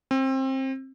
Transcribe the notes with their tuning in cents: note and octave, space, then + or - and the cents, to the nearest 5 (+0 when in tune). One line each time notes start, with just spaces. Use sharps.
C4 +25